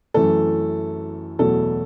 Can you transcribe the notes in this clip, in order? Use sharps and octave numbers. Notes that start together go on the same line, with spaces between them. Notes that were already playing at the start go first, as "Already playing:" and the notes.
F#2 E3 A3 A4
E2 B2 F#3 A3 A4